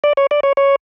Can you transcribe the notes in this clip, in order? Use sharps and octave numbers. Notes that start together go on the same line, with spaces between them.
D5
C#5
D5
C#5
C#5